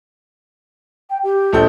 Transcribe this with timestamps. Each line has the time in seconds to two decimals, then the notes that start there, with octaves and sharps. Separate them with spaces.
1.10 G5
1.23 G4
1.53 A#1 A4 G6